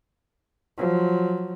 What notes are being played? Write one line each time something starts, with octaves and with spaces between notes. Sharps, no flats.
F3 F#3